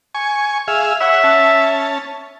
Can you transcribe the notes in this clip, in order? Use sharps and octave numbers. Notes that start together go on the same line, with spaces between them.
G#5 C#6
G#4 E5 F5
C#5 E5 F#5
C#4 A5